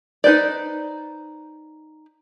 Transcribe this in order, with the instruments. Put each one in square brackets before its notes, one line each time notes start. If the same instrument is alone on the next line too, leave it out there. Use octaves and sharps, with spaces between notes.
[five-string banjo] D#4 B4 C5 D5